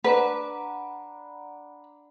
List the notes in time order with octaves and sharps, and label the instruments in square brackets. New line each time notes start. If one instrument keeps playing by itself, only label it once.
[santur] D4 D6 [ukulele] B4 [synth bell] F#5 A#5 B5